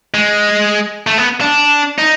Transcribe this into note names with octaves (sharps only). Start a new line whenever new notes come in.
G#3
A3
B3
D4
D#4